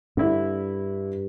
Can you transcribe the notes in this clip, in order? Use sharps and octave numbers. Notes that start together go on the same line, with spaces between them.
G2 D3 E4